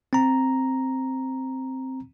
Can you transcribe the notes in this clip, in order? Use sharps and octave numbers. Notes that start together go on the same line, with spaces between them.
C4 A#5